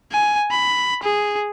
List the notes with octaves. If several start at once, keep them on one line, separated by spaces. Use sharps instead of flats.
G#5
B5
G#4